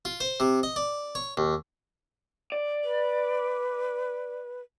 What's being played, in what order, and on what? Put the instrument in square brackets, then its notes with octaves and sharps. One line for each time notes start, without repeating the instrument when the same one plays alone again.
[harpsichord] F4
C5
C3
D#5
D5
C#5
D#2
[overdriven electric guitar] D5
[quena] B4